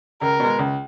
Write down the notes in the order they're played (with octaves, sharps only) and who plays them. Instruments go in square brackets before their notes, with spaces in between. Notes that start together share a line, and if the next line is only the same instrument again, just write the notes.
[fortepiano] C#2 [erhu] A#4
[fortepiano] B2
G#3
C#2